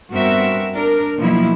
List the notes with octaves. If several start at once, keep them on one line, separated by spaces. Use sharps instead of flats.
G2 B3 C4 F#4 A#4 E5
D4 A#4
B2 F3 F#3 A#3 E4